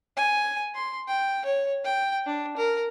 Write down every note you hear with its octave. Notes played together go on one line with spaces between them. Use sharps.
G#5
C6
G5
C#5
G5
D4
A#4